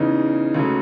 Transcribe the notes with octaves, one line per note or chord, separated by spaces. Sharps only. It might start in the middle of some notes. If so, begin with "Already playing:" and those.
Already playing: E2 C#3 E3 D#4
C#2 C#3 F#3 A3